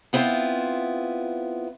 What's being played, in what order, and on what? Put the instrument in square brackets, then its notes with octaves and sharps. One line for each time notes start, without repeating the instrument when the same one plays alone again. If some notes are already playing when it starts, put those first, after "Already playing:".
[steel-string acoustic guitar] B3 C4 E4 F4